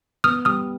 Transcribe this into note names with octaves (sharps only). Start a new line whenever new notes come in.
B3 D#6 F6
G3 D#6 F6